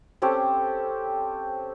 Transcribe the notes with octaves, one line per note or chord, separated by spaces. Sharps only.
C4 C#4 G4 A4